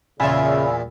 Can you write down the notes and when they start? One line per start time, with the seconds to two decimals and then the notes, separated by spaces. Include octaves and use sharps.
0.20 E2 A#2 C#3 F4 E5 G#5 B5 E6